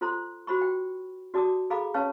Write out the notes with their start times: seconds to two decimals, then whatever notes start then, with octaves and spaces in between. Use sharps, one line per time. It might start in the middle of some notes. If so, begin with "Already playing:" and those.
0.01 F4 A4 C5 A#5 C6
0.47 F#4 C5 B5 C#6
0.61 G5
1.34 F#4 D5 A5 D6 D#6
1.70 G#4 A4 F5 A#5 B5 D6
1.94 C#4 B4 C#5 F5 A5 C#6